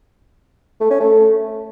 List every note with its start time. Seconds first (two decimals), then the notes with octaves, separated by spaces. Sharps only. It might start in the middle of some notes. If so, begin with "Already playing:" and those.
0.81 A3
0.90 C#4
1.00 A3